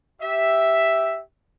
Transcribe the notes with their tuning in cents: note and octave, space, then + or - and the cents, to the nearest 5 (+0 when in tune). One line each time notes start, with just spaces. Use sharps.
G4 +0 E5 +0